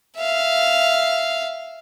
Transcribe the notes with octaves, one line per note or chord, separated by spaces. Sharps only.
E5 F5